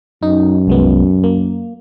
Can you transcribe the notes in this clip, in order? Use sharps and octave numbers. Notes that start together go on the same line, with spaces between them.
F#2 D#4
C2 G#3 B3
A#3